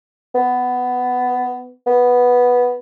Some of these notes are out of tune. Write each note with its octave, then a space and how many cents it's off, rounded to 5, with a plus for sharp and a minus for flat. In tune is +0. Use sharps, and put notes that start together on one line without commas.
B3 +10
B3 -5